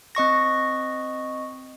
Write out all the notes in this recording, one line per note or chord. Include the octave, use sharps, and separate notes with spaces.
C4 D#5 C#6 A#6